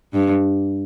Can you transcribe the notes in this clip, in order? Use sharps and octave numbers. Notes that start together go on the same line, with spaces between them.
G2